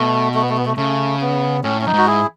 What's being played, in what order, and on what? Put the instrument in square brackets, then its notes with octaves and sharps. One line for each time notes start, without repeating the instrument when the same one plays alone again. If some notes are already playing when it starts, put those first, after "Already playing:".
Already playing: [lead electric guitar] B2 [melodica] A3
[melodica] A3
B3
A3
B3
A3
[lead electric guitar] C#3 [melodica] A3
[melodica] B3
[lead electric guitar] A2 [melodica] C#4
[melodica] C#4
[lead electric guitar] F#2 [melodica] D#4
[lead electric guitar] G#2 [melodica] F#4
[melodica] E4 G#4